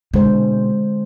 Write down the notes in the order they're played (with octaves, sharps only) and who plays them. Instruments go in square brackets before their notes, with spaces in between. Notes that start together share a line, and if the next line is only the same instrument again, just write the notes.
[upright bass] B2 [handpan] D3 G#3 C5